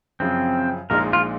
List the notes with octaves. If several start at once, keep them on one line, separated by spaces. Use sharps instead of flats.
F#2 C#3 F3 C4
A#1 A#2 G#3 D#4 A#4
F4